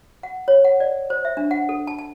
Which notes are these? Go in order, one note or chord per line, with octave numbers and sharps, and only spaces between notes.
F#5
C#5
F#5
D5
C5
E5
D4
F#5
A4
A5
A5